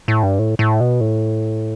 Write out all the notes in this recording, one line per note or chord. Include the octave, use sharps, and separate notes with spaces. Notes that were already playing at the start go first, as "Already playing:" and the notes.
A2
G2
A2
A2
B2
A2